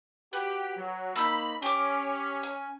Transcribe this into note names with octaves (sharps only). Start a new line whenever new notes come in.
F#4 G4 B4
F#3
A#3 C4 D#4 B5 E6 G6
C#4 G4 D6
G#5